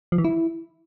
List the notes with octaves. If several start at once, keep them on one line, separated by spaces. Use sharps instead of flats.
F3
E3
E4